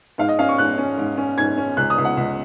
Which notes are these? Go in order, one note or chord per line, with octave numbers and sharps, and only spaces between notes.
G#2 F5
D#5
C#4 F5
C#6
G#2 F#6
C#4
G#2
C#4
G#2 G#6
C#4
C#2 F#6
D#6
C#2
F#5
C#2